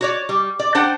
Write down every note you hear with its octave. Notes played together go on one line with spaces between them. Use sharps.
F#4 C#5 D5
G3
D5
D4 C5 F#5 G5